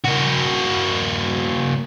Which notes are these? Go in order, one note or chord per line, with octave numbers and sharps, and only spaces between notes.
A#3 F#4